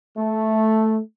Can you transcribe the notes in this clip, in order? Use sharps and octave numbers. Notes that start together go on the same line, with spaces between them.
A3